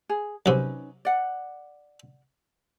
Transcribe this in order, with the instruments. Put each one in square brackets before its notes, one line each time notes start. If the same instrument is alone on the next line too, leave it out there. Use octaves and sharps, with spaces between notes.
[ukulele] G#4
[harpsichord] F#2 C3 [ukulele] C#4 D#4 B4
[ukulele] D5 F#5